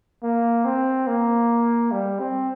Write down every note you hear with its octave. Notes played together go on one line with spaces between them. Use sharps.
A#3
C4
A#3
G3
C4